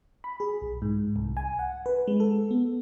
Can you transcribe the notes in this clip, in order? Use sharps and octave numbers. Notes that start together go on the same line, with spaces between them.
B5
G#4
B1
G#2
C2
G#5
F#5
B4
G#3
A4
B3